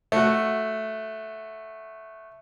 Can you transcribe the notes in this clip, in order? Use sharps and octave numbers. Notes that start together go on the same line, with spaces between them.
A3 F#4